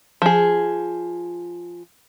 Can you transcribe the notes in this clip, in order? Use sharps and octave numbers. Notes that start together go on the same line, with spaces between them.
F3 G#4